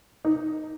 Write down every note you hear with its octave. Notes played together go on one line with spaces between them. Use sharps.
D#4